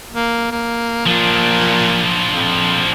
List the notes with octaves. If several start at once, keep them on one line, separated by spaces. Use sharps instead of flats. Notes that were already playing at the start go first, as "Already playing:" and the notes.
A#3
A#3
A#2 F3 D4
F2